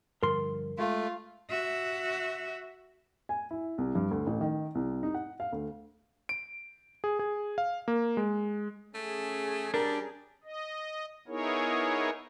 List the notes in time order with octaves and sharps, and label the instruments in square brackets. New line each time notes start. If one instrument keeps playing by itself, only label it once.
[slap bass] G2 D3 F3 [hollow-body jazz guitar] A#4 C6
[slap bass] G#3 [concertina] A3 [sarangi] F4
[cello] F#4 E5
[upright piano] G#5
E4
C2
G2
D2
A1
D#3
C2
D#4
F#5
F5
D2
[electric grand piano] D7
G#4
G#4
F5
A#3
G#3
[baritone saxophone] A3 [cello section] C#4 G#4
[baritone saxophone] G3 [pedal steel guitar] D4 [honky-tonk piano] A#4
[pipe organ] D#5
B3 D#4 E4 G#4 A#4 C#5